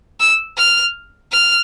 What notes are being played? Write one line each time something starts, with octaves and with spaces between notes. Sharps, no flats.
E6
F6
F6